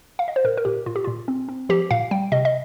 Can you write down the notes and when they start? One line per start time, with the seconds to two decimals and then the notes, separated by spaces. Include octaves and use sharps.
0.19 F5
0.28 D#5
0.36 C5
0.44 A#2 A#4
0.58 A#4
0.65 A#2 G4
0.86 A#2 F4
0.96 G4
1.04 A#2 F4
1.28 C4
1.49 C4
1.69 F3 G4
1.91 A#2 F5
2.11 G3 G5
2.32 C3 D#5
2.45 D#5